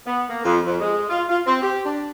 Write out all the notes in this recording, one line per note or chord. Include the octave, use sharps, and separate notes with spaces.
B3
A#3
F2
F2
G#3
F4
F4
C4
G4
D4